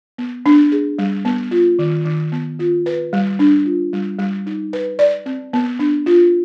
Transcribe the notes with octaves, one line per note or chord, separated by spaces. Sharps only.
B3
D4
G#4
G3
B3
F4
D#3
D#3
B3
F4
B4
G3
D4
F4
G3
G3
D#4
B4
D5
C4
B3
D4
F4